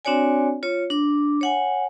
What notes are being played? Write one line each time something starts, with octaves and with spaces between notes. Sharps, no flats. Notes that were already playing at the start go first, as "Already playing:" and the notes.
C4 D4 F#4 C#5 D5 G#5
F4 C#5
D4 D6
C#5 F#5 G#5